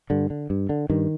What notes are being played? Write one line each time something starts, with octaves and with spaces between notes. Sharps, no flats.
G2 D3
D3
G2
D3
G2 D#3